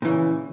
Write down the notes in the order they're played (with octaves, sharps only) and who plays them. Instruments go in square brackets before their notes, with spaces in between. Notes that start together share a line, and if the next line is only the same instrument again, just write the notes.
[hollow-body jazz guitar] A#2
E3
C#3